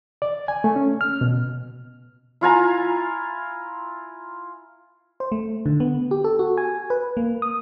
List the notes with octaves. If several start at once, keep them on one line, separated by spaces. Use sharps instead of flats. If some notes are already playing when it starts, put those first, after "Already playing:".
D5
G#5
A3
C#4
F6
B2
E4 F4 G#5 A#5
C5
A3
D3
B3
G4
A4
F#4
G#5
B4
A#3
D#6